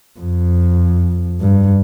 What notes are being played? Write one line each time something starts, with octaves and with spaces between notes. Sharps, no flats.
F2
G2